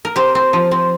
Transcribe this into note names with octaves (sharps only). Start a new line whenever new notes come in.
A#4
C4 G4
C4
F3
C4